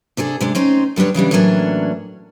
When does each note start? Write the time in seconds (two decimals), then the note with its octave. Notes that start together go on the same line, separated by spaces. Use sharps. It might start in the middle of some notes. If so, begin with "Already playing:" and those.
0.17 C3 D4 G#4 A4
0.41 C3 G#3 D4
0.55 C4 C#4 D#4 C5
0.96 D3 G3 B3 D4 C#5
1.14 C#3 E3 G3 D4
1.31 A2 E3 F#3 A#3 C#4 D4